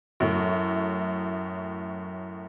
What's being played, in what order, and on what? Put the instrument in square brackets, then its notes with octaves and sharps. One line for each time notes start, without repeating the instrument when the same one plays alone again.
[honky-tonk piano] F#2 A2